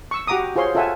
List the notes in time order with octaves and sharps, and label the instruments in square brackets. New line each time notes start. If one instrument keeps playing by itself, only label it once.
[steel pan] C#6 E6
F#4 G4 F#5 A#5 D6 D#6
F4 G#4 C5 C#5 C6
F4 A4 E5 F#5 G#5 A5